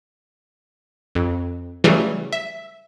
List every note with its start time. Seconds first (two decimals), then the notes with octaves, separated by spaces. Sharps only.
1.15 F2
1.84 C#3 E3 F#3 G3 A3
2.33 E5